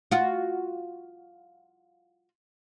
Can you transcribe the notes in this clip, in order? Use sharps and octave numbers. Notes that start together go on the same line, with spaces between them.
F4 F#4